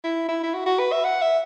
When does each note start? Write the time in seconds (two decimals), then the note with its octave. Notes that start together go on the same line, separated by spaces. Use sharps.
0.04 E4
0.28 E4
0.43 E4
0.54 F#4
0.66 F#4
0.79 B4
0.92 E5
1.04 F#5
1.22 E5